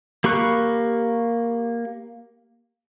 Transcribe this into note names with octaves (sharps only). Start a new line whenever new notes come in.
A#3 G4 B5 C#6 F#6